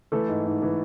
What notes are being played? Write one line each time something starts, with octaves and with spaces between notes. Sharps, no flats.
E3 A3 A4
G#2
G#2
E3